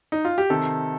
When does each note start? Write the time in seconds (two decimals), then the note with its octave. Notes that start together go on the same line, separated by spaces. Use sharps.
0.12 D#4
0.25 F4
0.38 G4
0.50 C3 D#3 A4